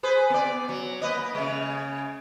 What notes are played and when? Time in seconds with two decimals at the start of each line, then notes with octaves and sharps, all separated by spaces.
0.03 G#4 B4 C5
0.30 B3 D5
0.69 F#3
1.02 A#3 B4 D#5
1.35 C#3 G#3